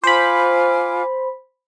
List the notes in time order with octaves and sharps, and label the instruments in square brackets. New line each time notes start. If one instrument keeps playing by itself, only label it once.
[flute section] F4 G#5 D6 [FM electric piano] C5 B5